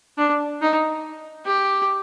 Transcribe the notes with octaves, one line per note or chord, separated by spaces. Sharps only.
D4
D#4
G4